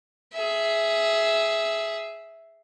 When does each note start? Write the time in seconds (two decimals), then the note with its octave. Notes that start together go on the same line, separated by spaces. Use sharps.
0.34 G#4 E5